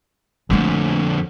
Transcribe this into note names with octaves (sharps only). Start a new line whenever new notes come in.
F2 D3 G#3 A3